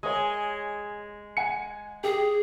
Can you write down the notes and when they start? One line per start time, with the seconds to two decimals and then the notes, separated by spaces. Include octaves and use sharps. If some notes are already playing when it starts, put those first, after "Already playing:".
0.03 G#3 C#5 D#5 D#6
1.37 F#5 G#5 C#7
2.04 G4 G#4